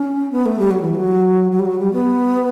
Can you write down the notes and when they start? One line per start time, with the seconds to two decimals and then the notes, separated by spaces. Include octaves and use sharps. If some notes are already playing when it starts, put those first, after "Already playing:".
Already playing: C#4
0.32 B3
0.46 A3
0.59 G3
0.71 F#3
0.82 E3
0.95 F#3
1.52 F#3
1.59 G3
1.65 F#3
1.80 G3
1.93 B3